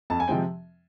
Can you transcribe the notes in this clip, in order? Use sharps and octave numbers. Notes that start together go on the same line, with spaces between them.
F2 A5
G#5
C3 F3 G#3 C4 G5